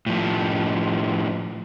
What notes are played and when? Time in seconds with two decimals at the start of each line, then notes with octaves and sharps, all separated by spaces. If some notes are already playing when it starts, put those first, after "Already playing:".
0.06 A2 F3